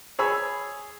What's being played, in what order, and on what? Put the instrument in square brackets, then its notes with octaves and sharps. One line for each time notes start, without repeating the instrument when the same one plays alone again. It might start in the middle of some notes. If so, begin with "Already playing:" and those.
[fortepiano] G#4 C#5 G#5 B5 E6